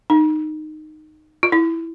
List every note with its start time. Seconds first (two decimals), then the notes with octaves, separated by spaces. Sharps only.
0.10 D#4
1.43 F4
1.52 E4